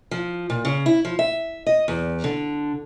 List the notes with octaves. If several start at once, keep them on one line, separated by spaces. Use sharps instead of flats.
F3
A#2
C#3
E4
F3
E5
D#5
E2
D3